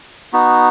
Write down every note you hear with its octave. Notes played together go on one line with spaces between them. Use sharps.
B3 D#4 F#4